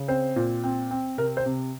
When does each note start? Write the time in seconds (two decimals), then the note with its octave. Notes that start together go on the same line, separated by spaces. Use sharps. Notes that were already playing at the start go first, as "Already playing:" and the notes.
Already playing: C#3
0.08 C4 C5
0.36 A#2
0.64 C4
0.91 C4
1.18 C3 A#4
1.37 C5
1.46 C3